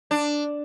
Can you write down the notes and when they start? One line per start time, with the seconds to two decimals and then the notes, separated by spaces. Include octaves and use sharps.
0.11 D4